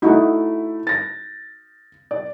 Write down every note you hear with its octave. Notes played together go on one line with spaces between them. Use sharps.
A3 D#4 E4 F#4
A6 A#6
D5